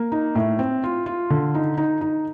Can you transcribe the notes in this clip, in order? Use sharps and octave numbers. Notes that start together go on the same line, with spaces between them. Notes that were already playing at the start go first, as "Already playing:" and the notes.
Already playing: A#3
D#4
A2
C4
F4
F4
D3
D#4
D#4
D#4